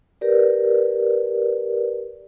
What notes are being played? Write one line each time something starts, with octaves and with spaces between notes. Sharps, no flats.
G4 A#4 B4 D5